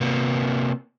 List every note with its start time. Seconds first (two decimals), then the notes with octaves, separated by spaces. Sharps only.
0.01 C3 A#3 B3